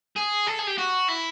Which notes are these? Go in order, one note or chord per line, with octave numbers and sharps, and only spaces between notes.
G#4
A4
G#4
G4
F#4
E4